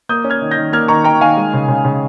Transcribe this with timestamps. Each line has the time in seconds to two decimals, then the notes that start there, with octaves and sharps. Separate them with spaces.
0.09 A#3 D#6 G6
0.24 C#4
0.30 F6 G#6
0.42 D#3
0.51 G6 A#6
0.57 D#3
0.72 A#3 F6 G#6
0.88 D#3 A#5 C#6
1.04 A#3 G5 A#5
1.21 D#3 F5 G#5
1.37 G#3
1.54 C#3
1.68 C#3
1.85 C#3